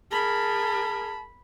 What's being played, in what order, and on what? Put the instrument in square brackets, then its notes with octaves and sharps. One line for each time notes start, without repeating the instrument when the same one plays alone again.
[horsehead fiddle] G#4 A#4 [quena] A5 [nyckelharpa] B5